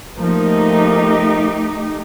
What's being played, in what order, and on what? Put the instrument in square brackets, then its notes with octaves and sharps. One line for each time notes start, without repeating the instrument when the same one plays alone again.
[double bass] F3 A#3 [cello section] A3 D#4 G4